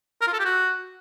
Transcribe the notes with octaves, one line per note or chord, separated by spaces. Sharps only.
A#4
F4
A4
G4
F#4